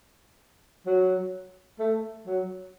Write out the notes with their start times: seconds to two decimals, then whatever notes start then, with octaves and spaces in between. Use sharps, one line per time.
0.86 F#3
1.79 A3
2.26 F#3